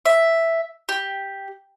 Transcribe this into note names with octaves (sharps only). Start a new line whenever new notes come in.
E5
G4